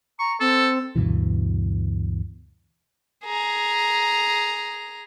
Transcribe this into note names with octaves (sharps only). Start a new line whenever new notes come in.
A#5 C#6
C4 A4
D2 G2 B2 E3
G#4 A#5